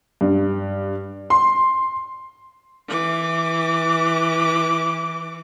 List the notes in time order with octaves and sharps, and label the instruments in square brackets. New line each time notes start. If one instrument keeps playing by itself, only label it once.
[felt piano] G2
C6
[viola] E3 D6